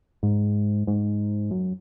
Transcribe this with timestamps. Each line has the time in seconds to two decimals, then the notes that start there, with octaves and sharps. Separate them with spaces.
0.23 G#2
0.87 G#2
1.51 F#2